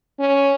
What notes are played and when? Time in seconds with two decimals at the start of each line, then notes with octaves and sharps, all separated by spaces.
0.19 C#4